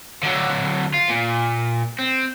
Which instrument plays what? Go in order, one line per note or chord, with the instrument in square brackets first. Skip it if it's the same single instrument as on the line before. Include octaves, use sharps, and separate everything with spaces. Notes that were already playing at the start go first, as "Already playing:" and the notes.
[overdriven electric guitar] D3 F#3
F4
A#2
C4